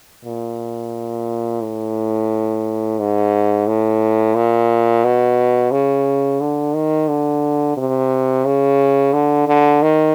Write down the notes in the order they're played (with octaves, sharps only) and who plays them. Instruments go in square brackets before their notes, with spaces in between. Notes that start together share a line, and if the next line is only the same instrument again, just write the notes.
[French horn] A#2
A2
G#2
A2
A#2
B2
C#3
D3
D#3
D3
C3
C#3
D3
D3
D#3